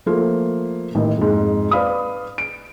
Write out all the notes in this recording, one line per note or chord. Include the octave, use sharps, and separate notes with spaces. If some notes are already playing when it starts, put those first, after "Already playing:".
F3 A3 A#3 F4
A1 D#3
F2 G#2
B4 D5 F5 B5 D#6
D7